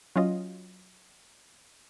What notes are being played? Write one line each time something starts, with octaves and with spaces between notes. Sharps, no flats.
F#3 C#4 F4 D#5